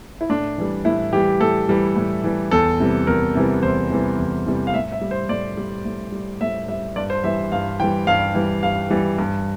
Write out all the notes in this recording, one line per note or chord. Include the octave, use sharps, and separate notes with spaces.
E4
A2 D4
E3 G3
A2 E4
E3 G3 G4
A2 A4
E3 G3
A2
E3 G3
E2 A4
C3 E3 G3
E2 A#4
C3 E3 G3
E2 C5
C3 E3 G3
E2
C3 E3 G3
F5
A2 E5
E5
G3
C5
A2 D5
G3
A2
G3
A2 E5
G3 E5
G2 D5
C5
E3 G3 E5
G2 F5
E3 G3 G5
G2 F5
E3 G3
G2 F5
E3 G3
G2